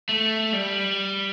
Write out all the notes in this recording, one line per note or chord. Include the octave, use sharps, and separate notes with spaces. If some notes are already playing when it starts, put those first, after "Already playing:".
A3
G3